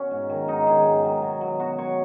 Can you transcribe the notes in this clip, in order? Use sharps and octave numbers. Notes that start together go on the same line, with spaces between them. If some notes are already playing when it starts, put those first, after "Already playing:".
Already playing: B2 C#4
G#2
D#3 F#3
G#2 D#4
D#3 F#3 G#4
G#2
D#3 F#3
B2
F#3
B2 F#4
F#3 C#5